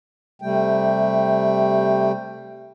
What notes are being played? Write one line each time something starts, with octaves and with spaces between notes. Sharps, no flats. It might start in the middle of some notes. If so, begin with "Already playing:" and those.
C3 G3 A3 G5